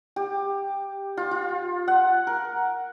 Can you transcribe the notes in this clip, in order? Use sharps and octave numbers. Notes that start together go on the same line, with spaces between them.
G4
F4
F4
F#5
A#4